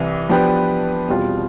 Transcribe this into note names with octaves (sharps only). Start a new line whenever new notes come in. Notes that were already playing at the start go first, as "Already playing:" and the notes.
Already playing: C2 C3 E3
F3 B3 D4 G4 B4
E2 B2 G3 C4 F4